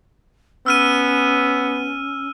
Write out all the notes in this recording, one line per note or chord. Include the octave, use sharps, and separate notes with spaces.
B3 C#4 E6 F6 D#7